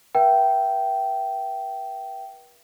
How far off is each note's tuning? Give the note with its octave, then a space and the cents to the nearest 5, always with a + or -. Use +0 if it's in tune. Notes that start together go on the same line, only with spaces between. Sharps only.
B4 -40 E5 +35 G5 -20